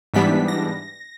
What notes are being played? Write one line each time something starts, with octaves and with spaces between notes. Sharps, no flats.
G#2 E3 G3 B3 D4 B6
A#6